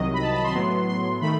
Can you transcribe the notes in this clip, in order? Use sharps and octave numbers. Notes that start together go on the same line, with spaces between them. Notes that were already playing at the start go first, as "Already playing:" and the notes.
Already playing: C2 C3 D#3 F#3 D#5
B5
A5
B5
C6
A2 F#3 B3
C6
D#3 A3 B5